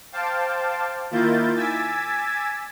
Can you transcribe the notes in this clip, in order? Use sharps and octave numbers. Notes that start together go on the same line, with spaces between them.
C5 F5 G5 A5 D6
D#3 A#3 E4 F4 G6 A6
G#5 D6 E6 G#6 A6 B6